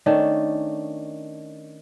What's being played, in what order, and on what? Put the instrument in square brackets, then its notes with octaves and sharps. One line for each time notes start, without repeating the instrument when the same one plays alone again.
[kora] D#3 A3 C#4 D4